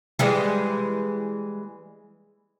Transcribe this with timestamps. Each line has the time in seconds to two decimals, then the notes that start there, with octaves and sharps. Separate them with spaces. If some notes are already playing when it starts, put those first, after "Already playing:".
0.19 E3 G3 G#3